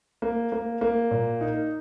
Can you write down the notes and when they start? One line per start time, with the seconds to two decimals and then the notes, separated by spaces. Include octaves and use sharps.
0.22 A#3
0.52 A#3
0.81 A#3
1.11 A#2
1.41 D#4